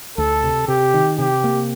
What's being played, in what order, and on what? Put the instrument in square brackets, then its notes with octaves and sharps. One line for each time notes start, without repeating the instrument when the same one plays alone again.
[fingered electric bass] D2 [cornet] A4
[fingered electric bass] C3
[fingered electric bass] C3 [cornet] G4
[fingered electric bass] D#3
[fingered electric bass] C3 [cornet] G4
[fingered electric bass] A#3